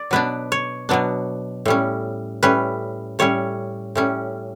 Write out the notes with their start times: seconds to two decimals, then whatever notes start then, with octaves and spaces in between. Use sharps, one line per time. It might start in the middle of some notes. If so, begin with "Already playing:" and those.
Already playing: D5
0.11 B2 F#3 B3 D4 B4
0.52 C#5
0.89 B2 F#3 B3 D4
1.66 A2 G3 C#4
2.43 A2 G3 C#4 B4
3.19 A2 G3 C#4 C#5
3.95 A2 G3 C#4